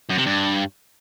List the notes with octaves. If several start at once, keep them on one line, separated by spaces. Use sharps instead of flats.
F#2
C3
G2